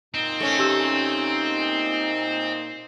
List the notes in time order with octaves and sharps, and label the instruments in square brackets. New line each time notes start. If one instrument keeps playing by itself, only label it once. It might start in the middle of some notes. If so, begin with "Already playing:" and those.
[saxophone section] A#2 D#4 [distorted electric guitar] C4
[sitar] A3 C#4
[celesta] G4 E6